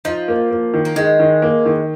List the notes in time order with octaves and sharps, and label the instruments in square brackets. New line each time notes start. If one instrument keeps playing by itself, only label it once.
[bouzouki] F3 [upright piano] D#4
[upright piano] A#3
A#3
D#3
[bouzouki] A#3
[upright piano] D#3 [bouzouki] G#3
[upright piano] D#3
A#3
D#3